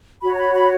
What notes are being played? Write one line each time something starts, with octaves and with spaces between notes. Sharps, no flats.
F#4 C#5 B5
A#5
B5
B5